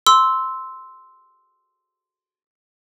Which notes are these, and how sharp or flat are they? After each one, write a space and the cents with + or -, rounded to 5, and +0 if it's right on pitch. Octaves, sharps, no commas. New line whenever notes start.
C6 -5 E6 -10